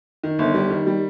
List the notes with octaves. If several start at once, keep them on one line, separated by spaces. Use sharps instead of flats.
D#3
G1
G3
D#3
G3